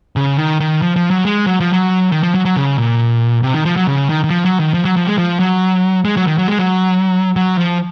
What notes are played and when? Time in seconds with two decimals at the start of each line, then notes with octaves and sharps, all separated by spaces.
0.16 C#3
0.38 D#3
0.60 D#3
0.82 F3
0.96 F3
1.10 F#3
1.25 G#3
1.47 F#3
1.60 F3
1.73 F#3
2.12 D#3
2.23 F3
2.34 F#3
2.45 F#3
2.56 C#3
2.78 A#2
3.43 C3
3.54 D#3
3.65 F3
3.76 F#3
3.87 C#3
4.09 D#3
4.24 D#3
4.30 F3
4.45 F#3
4.60 D#3
4.74 F3
4.85 F#3
4.96 F3
5.07 G#3
5.18 F3
5.40 F#3
6.05 G#3
6.17 F#3
6.27 D#3
6.38 F#3
6.48 G#3
6.59 F#3
7.36 F#3
7.58 F3